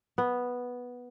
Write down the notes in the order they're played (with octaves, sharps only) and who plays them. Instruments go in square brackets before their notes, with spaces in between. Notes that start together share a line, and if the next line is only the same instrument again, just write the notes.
[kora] B3